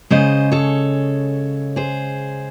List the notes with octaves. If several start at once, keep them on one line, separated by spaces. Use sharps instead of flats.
C#3 G#3 C5 D#5
A4 C#5
G#4 C5